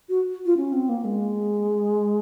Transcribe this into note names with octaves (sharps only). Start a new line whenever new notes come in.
F#4
F4
C#4
C4
A#3
G#3